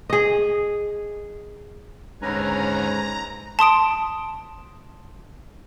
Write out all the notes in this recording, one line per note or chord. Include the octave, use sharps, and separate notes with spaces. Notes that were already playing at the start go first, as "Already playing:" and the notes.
G#4 D#5
D#2 G#2 D3 C#4 B4 G#5 A#5
A5 C6 D#6 D7